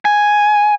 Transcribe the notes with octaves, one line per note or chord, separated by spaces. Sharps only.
G#5